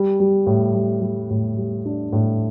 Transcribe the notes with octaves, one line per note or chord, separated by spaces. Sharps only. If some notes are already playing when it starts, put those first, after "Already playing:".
Already playing: G3
G3
A2
G3
G3
A2
G3
D4
A2